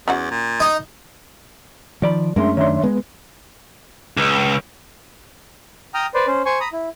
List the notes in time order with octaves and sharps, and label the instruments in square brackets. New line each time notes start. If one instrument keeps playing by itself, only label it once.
[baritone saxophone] E2 [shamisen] C#4 F#4 F#5
[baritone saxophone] A#2
[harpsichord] D#4
[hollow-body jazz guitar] D#3 D5 B5 [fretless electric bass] F3
[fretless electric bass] F#2 A3 C#4 [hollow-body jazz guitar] G#3 A#4 [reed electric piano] D4 E5 C6
[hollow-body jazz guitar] D#3 D4 [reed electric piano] C#5 E5 C6
[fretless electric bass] G#3 [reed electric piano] B3 B4
[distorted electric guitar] C#2
[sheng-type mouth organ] G5 A#5 D#6 F6
B4 C5 D5
C#4 C5
C5 G#5 C#6
A#5 B5 D#6
E4